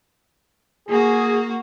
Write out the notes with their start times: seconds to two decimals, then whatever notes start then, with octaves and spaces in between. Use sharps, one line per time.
0.88 A#3 F#4 G#4